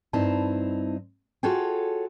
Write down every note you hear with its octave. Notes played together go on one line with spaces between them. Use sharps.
G2 C4 D#4 E4 A5
F4 F#4 G#4 A4 C#5 G5